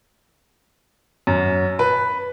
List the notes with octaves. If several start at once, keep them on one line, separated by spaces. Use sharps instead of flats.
F#2
B4